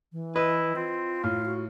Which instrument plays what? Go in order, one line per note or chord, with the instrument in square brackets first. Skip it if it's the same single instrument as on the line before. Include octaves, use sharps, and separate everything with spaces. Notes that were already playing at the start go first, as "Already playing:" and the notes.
[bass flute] E3
[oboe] E4 [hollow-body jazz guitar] B4 [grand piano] D#5
[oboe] C4 [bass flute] F4
[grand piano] A2 [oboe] F5
[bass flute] F#4